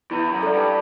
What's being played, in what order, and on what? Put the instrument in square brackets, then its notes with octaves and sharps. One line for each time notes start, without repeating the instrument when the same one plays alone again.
[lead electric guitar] E2 [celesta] E4
[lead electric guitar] F#2
[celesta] A4 D5
[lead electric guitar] G2